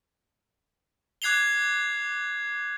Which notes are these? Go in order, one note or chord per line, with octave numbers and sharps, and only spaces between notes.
D6 F#6 G#6 C7 F7 G7